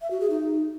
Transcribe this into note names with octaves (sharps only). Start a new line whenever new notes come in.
E5
F#4
G#4
D#4